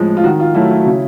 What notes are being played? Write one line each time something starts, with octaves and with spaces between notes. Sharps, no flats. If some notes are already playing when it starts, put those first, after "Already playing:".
Already playing: A2 F3 G#3
F4
D#3 F#4
F4
F#3 A3 E4
E4
C#3